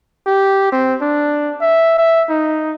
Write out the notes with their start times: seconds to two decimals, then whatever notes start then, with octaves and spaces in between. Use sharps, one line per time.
0.27 G4
0.72 C4
1.02 D4
1.61 E5
1.98 E5
2.29 D#4